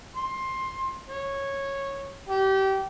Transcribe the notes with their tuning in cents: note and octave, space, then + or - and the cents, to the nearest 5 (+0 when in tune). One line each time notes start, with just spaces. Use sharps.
C6 +15
C#5 -10
G4 -25